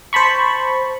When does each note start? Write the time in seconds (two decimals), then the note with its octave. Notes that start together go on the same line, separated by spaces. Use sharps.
0.13 C5 A5 B5 C#6